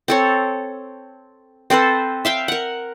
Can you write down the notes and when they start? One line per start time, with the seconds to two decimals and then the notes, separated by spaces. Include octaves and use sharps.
0.08 C4 A4 C#5
1.70 C4 A4 B4 C5
2.25 E5 F5 G5
2.48 A#4 F#5